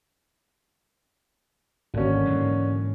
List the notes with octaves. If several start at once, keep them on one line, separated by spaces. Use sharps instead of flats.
G#1 D3 A#3 C#4
G#2 E3 G#3